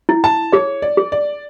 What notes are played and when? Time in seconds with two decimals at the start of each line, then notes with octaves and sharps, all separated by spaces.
0.09 E4
0.24 A5
0.52 G#4 C#5
0.82 D5
0.97 G#4
1.12 D5